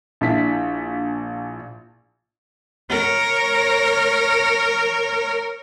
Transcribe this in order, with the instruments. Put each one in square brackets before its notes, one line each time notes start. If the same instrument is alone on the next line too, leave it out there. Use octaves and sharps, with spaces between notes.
[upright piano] A#1 D4 E4 B6
[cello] A#4 C#5